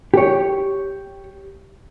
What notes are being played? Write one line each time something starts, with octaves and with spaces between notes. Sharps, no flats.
G4 C#5